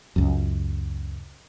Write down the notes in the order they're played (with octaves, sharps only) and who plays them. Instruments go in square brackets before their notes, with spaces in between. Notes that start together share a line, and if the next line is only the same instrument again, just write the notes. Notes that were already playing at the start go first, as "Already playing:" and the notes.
[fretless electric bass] C#2 F#2